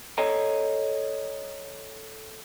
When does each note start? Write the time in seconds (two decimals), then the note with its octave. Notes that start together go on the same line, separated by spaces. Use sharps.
0.18 A4 C#5 D#5 A#5